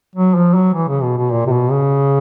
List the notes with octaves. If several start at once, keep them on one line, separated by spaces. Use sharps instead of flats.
F#3
F3
F#3
E3
C#3
B2
B2
A#2
C3
B2
C#3